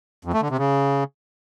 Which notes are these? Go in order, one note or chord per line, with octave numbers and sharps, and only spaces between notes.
F2
A3
D3
C3
C#3